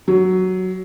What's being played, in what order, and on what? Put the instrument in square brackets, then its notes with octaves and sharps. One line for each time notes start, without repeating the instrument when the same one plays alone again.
[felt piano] F#3